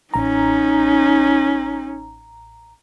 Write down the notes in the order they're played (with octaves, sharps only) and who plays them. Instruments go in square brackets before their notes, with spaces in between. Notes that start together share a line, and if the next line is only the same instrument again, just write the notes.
[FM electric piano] A1 A#5 [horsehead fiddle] C#4 D#4